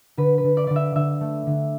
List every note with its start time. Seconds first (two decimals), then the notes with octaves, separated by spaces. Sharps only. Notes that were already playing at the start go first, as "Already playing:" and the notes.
0.17 D3 B4
0.38 B4
0.44 D3
0.57 D5
0.67 D3 D5
0.76 E5
0.95 D3 E5
1.21 A3
1.47 D3